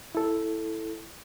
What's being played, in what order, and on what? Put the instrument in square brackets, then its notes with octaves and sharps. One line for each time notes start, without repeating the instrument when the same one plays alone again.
[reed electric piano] E4 A4